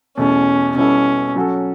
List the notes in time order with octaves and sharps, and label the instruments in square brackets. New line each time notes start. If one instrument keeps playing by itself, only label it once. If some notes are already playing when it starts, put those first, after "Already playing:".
[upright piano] E2 B2 A3 [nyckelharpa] C#4
[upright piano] B2 G3 B3 E4 A4 [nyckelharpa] C#4
[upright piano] F#3 C#4 F#4 A4